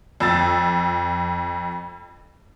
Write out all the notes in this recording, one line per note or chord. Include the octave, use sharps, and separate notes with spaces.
F2 E6 A6